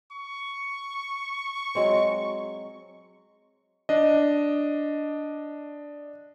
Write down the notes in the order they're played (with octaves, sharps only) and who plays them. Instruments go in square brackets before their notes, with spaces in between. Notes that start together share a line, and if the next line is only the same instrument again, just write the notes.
[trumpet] C#6
[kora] F#3 G#3 C4
[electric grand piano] D4 D#5